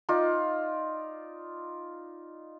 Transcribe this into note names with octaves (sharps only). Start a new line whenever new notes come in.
D#4 F4 D5